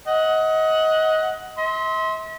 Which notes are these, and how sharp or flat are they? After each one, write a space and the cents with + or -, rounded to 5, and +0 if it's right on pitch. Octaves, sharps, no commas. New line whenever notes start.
D#5 +25 F#5 +0
E5 -45 C6 +0